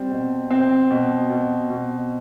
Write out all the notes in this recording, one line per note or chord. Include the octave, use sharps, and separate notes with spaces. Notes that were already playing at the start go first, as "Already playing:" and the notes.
Already playing: G3 C4
B2
C4
B2
B2
B2